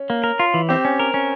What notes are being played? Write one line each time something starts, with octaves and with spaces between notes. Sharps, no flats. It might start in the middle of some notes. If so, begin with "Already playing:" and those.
Already playing: C#4
A#3
A#4
F4
E3
C4 G4
C#4
A#4
C#4